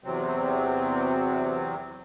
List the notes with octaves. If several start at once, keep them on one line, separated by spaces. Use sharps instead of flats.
E2 C3 F#3 C4